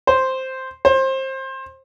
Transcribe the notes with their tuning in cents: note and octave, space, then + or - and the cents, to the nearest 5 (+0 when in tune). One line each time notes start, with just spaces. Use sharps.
C5 +0
C5 +25